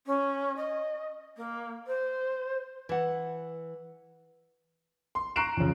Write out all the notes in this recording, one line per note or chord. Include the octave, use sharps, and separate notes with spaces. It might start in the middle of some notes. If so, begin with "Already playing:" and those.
C#4
D#5
A#3
C5
E3 F#5
C6
A#5 C#6 F#6 C7 D7 E7
F2 C#3